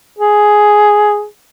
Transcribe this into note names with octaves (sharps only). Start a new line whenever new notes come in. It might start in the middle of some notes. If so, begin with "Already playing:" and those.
G#4